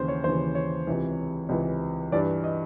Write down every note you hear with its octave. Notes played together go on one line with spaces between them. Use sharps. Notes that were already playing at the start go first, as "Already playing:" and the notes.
Already playing: D#2 C#3 E3 C5
C#5
D#2 C#3 E3 C5
C#5
C#2 C3 E3
C#2 C3 E3
G2 E3 D5
D#5